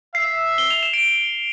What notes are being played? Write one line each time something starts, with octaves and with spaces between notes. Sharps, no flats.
E5 C7
G7
F7
E7
D7